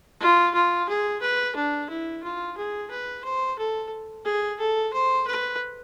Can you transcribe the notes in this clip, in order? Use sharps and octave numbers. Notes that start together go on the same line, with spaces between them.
F4
F4
G#4
B4
D4
E4
F4
G#4
B4
C5
A4
G#4
A4
C5
B4